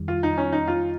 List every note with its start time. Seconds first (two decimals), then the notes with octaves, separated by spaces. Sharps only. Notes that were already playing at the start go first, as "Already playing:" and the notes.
Already playing: F2 D#3 G3
0.08 F4
0.23 D#4
0.37 C#4
0.53 D#4
0.68 F4